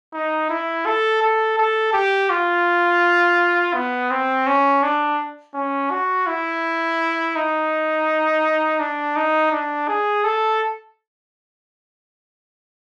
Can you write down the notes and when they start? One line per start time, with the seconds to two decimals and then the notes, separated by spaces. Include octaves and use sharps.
0.13 D#4
0.49 E4
0.86 A4
1.22 A4
1.58 A4
1.93 G4
2.30 F4
3.74 B3
4.11 C4
4.47 C#4
4.83 D4
5.54 C#4
5.91 F#4
6.27 E4
7.36 D#4
8.80 D4
9.16 D#4
9.52 D4
9.88 G#4
10.24 A4